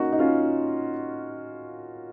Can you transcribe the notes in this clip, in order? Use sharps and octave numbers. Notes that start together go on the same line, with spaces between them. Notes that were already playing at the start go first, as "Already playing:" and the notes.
Already playing: A#3 C#4 D#4 F#4
D#4
C#4 F4